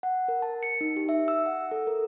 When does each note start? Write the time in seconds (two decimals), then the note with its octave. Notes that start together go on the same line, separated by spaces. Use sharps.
0.03 F#5
0.28 A#4
0.42 A5
0.63 C#7
0.81 D#4
0.97 G4
1.09 E5
1.28 E6
1.46 F#5
1.71 A4
1.87 A#4